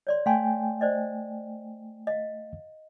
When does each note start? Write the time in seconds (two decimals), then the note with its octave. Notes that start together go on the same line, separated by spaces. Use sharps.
0.07 C#5 D5 C6
0.26 A3 F5 G5 G#5 C6
0.81 C5 D5 D#5
2.07 D#5 F5